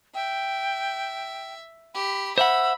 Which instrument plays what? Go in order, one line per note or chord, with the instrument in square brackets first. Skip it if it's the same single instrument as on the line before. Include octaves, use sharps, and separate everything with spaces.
[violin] E5 [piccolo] G5
[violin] G4 [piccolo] B5
[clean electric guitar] C5 E5 F#5 [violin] B5 [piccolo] E6